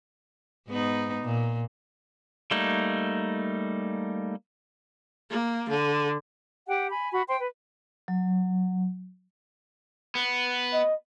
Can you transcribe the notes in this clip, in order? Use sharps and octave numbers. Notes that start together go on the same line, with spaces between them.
G#2 B3 D#4
A#2
G3 A3 A#3 D#4
A#3
D3
G4 F#5 G5
G#5 B5
F#4 B5
C5 G5 C6
B4
F#3
B3
D#5